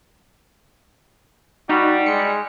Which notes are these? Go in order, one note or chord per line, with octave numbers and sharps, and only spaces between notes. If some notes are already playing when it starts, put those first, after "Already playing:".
G3 D#4 F#4
G#3 C#7